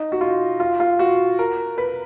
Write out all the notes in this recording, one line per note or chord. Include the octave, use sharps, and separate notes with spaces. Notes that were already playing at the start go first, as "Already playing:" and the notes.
Already playing: D#4
F#4
F4
F4
F4
F#4
A#4
B4